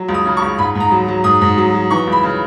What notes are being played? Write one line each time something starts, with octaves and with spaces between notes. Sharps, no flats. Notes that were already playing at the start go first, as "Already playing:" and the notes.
Already playing: F#3
C#2
D#6
C#3
C#6
C#2
G#2 B5
G#2
A#5
F#3
F#3
G#2 D#6
G#2
F#3
F#3
E3 C#6
C#2
B5
C#3